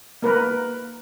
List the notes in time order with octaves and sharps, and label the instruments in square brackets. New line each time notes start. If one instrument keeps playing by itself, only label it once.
[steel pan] A#3 A#4 B4